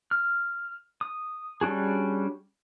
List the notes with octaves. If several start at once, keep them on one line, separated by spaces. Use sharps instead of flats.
F6
D#6
G3 C#4 D4 F#4 G#4